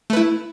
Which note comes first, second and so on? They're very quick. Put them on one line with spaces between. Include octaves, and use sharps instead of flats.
A3 B4 E4